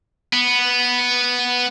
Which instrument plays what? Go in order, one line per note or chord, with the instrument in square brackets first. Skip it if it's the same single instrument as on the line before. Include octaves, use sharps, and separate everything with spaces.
[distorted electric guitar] B3